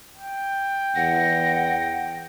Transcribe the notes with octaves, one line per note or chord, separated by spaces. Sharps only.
G5
E2 F#5 A#6